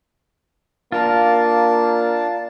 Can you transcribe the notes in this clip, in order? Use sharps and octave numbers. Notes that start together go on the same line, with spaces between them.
A#3 D4 F4 A#4 A5